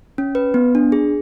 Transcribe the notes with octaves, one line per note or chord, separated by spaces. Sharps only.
C#4
B4
B3
D4
G#4